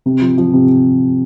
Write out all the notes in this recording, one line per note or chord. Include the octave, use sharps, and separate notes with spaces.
C3
F3
F3
C3